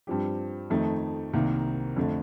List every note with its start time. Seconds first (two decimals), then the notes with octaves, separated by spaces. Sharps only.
0.07 G2 F3 C4 G4
0.70 F2 D#3 A3 D#4
1.33 C2 C3 D#3 A#3
1.96 F2 D3 A3